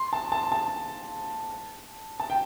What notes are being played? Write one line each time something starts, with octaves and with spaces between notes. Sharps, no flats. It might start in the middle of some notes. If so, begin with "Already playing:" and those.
Already playing: C6
A5
A5
A5
A5
G5